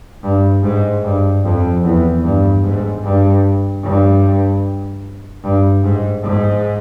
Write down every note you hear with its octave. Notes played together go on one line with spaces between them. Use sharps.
G2
G#2
G2
F2
E2
G2
G#2
G2
G2
G2
G#2
G#2